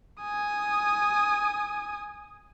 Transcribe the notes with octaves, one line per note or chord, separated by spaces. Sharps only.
G#5 D#6